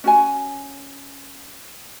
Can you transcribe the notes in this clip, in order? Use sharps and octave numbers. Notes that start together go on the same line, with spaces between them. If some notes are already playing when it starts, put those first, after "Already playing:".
C#4 F#4 G#5